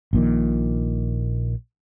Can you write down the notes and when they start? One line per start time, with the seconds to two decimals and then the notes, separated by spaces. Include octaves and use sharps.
0.13 A#1 A#2 D#3